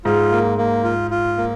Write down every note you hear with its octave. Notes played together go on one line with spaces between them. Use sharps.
G#2 F4
A#3
A#3
F4
F4
A#3